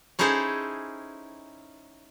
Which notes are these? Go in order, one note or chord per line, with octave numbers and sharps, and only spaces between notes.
C#4 D#4 E4 G#4 A4 C5